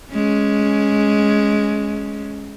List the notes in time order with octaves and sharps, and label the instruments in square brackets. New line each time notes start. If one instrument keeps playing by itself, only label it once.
[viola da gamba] G#3 C#4